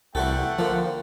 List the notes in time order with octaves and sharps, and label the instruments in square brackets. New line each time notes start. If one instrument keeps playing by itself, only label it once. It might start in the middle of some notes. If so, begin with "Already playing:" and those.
[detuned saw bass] C2 [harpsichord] E3 F#4 A4 [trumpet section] A3 F#5 G5
[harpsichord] D3 A#3 [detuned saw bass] F3